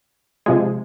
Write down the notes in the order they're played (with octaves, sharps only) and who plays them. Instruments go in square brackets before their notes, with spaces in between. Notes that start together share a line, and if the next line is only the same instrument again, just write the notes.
[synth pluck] C3 F3 G#3